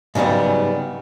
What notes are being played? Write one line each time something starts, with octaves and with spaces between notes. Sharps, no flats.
G#2 C#3 F#3 G3 B3